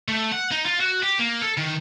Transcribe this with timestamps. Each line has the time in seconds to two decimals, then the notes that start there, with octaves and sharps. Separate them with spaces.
0.08 A3
0.32 F#5
0.51 D#4
0.66 F4
0.80 F#4
1.03 G4
1.19 A#3
1.41 A4
1.57 D#3